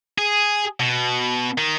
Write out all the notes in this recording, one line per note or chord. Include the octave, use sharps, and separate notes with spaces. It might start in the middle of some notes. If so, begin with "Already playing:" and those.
G#4
B2
D#3